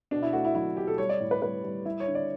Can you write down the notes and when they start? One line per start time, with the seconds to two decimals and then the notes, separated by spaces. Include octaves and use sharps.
0.11 B2 D4
0.22 E4
0.33 A3 F#4
0.45 E4
0.55 F#3 E4
0.77 B2 G4
0.87 A4
0.98 G3 C#5
1.09 D5
1.20 A2
1.31 B4
1.42 G3 B4
1.64 G3
1.85 G3 E4
2.00 C#5
2.07 D3
2.15 D5